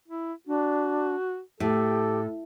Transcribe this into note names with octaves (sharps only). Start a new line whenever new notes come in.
E4
D4 F#4
A2 G4 A4